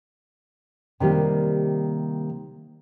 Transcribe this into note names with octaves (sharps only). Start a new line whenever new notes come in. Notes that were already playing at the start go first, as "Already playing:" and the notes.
C3 D#3 G3 A#3